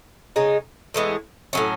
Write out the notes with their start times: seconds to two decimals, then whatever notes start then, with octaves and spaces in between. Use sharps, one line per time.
0.36 C#3 G#3 D#4
0.94 A2 E3 G#3 B3
1.53 A2 F#3 C#4